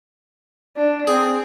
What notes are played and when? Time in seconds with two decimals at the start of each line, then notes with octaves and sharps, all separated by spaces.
0.77 D4
1.07 C4 G#4